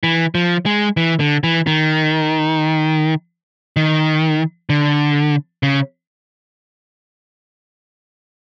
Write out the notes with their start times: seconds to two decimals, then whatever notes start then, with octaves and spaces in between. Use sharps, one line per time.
0.03 E3
0.35 F3
0.66 G#3
0.97 E3
1.20 D3
1.44 E3
1.67 D#3
3.76 D#3
4.70 D3
5.63 C#3